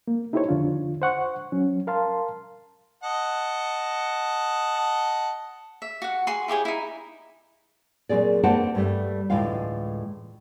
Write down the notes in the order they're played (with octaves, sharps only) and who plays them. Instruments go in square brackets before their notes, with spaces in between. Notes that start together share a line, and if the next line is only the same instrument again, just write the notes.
[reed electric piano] A#3
D#4 E4 G4 A4 C5 C#5
F2 D3 D4 F4
C5 F#5 C#6
F#3 C#4
A#4 F5 A5 C6
[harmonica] D#5 F#5 A5
[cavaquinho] E5
F#4 F#5
F#4 G#4 C6
E4 G4 G#4 C#5
D#4 E4
[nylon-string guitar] A#2 F#3 C4 G#4 D5
A#3 C4 B4 C5 F#5 A5
G2 G3 A3
D2 A2 E3 G#3 F4 F5